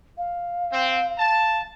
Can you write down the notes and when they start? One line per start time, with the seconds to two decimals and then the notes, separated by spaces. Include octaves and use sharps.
0.18 F5
0.72 C4
1.18 A5